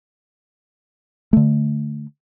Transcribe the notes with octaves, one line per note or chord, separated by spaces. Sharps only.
D3 A3